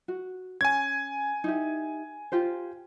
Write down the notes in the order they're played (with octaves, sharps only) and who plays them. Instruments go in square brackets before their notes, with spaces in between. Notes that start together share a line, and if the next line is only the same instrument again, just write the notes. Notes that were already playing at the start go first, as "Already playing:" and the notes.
[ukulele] F#4
[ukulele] C#4 [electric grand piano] G#5 G#6
[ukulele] D#4 E4 G4
F4 G4 C5